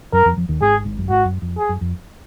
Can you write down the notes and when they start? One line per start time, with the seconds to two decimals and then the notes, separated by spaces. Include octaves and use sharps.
0.13 F#2 F#3 A#4
0.25 F2 F3
0.36 F2 F3
0.48 D#2 D#3
0.61 G#1 G#2 G#4
0.85 G#1 G#2
0.98 F#2
1.09 G#1 G#2 F#4
1.25 F#2
1.42 F2
1.58 G#4
1.69 F#2
1.81 F2